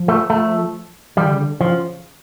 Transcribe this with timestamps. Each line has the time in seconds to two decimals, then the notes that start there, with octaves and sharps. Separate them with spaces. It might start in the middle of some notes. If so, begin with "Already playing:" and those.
Already playing: F3
0.08 A3
0.30 A3
1.17 E3 G3
1.25 D3
1.33 C#3
1.40 D3
1.60 C#3 F3